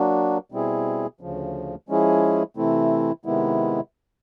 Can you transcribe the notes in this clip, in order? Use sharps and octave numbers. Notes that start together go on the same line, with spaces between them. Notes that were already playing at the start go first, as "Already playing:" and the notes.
Already playing: F#3 A#3 D4 F#4
B2 G3 C4 E4 G#4
D2 C#3 F3
F3 G#3 C#4 E4 G#4
C3 E3 A3 C4 E4
C3 D#3 G#3 B3 E4